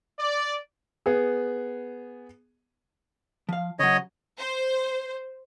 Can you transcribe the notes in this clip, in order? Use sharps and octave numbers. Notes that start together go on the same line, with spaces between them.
D5
B3 G#4
F3 F5
C#3 F#3 C#5 D#5
C5